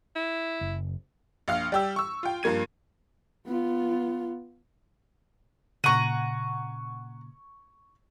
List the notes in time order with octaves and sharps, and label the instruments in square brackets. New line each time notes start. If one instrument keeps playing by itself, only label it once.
[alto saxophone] E4
[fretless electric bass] F#1
[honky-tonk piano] A#1 F5 F6
G3 G4 E6
C#6 E6
F4 G5
G2 F3 A#3 G#6 D#7
[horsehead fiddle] B3 F4
[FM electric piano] A#2 C#3 [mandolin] F#5 A#5 [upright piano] C#6 D#7